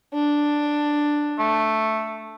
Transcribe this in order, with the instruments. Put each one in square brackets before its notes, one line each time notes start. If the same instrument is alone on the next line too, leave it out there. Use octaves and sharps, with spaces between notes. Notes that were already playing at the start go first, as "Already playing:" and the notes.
[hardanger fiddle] D4
[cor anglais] A3